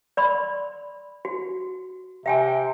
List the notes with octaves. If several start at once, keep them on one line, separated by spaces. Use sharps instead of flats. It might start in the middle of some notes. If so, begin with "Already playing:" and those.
D5 B5 C6
F#4
C3 E5 G5 G#5